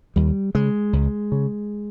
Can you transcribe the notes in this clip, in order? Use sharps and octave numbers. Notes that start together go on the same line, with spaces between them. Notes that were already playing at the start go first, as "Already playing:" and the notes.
D#2 G3
C#3 G#3
C#2
C#3